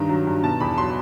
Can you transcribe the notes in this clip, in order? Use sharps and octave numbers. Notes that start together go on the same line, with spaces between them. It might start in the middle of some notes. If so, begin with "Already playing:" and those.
Already playing: G2 D#3 A#5
F#3
G2
B2 A5
E2 B5
F#3 C6